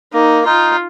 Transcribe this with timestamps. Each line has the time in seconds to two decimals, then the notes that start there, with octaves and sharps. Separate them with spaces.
0.13 A#3 D#4
0.45 D#4 F4